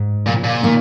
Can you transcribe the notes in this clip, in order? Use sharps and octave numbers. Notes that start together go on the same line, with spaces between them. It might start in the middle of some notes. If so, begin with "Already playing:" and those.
Already playing: G#2
A#2 C#3 F3 A#3
A#2
D#3 A#3